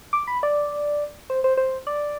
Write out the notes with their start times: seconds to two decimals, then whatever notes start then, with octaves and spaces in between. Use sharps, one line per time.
0.13 D6
0.27 B5
0.43 D5
1.30 C5
1.44 C5
1.57 C5
1.87 D5